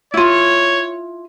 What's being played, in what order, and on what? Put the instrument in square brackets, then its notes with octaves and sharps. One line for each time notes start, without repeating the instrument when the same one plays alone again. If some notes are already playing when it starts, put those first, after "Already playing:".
[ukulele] E4 F4 [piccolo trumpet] C#5